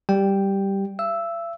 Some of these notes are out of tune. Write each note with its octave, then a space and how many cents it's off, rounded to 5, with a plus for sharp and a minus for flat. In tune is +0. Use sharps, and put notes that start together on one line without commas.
G3 +0 G4 +0 G5 +0
E5 +45 E6 +0